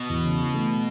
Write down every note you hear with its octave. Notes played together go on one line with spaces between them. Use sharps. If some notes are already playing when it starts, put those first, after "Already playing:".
Already playing: B2
E2
C#3
E3
A3